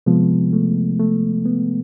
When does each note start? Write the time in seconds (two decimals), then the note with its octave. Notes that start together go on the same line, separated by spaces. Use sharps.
0.06 C3 F3 G#3 B3
0.53 A3
0.99 A3
1.46 B3